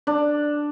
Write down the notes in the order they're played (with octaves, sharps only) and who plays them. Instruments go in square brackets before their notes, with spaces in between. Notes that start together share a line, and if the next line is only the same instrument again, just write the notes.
[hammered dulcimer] D4